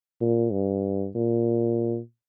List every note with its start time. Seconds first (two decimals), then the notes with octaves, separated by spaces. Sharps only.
0.21 A#2
0.52 G2
1.15 A#2